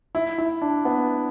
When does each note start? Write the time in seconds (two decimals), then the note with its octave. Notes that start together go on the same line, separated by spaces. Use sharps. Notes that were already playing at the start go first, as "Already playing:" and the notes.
0.15 E4
0.38 E4
0.62 D4
0.85 B3